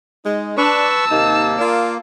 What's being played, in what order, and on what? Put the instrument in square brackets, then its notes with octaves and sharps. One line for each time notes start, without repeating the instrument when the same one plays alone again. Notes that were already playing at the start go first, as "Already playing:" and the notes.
[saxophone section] G#3 D#4
[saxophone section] D4 [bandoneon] B4 C#6 [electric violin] A5 E6
[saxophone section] D#2 C3 D#4 [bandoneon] A#3
[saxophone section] F4 A#4 D5